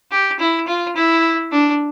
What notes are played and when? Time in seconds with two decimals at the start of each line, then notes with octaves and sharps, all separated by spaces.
0.11 G4
0.39 E4
0.67 F4
0.96 E4
1.51 D4